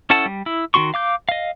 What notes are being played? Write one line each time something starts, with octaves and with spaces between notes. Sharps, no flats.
C#4 E4 A4 F#5 A5
G3
E4
D#3 C#4 F#4 C6 C#6
F5 D6 G6
D#5 F5